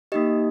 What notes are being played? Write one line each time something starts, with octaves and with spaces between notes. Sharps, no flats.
A#3 D#4 G4 D#5